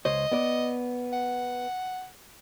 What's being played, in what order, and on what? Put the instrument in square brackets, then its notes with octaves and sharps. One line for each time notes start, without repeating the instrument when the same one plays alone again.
[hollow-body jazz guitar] C#2 C5 C#5 [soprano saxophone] D#5
[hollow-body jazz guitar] B3 D5
[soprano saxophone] F#5